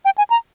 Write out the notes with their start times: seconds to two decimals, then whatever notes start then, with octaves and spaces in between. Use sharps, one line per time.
0.05 G5
0.18 G#5
0.30 A#5